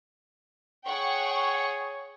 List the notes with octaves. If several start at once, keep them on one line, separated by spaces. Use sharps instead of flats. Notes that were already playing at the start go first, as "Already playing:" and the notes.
G#4 C#5 F#5 G5 C#6